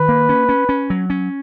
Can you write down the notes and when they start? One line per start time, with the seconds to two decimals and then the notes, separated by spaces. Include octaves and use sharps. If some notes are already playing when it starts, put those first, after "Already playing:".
Already playing: D#3 B4
0.09 A#3
0.29 C#4
0.49 C#4
0.69 C#4
0.90 F#3
1.10 C#4